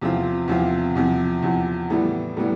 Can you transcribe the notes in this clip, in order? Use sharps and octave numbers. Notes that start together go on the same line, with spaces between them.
E2 C3 F3 C4 F4
E2 C3 F3 C4 F4
E2 C3 F3
E2 C3 F3
A2 E3 G3 B3
A2 E3 G3 B3